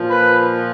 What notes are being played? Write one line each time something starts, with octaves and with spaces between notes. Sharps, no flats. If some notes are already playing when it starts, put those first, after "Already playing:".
Already playing: A#2 F3
B4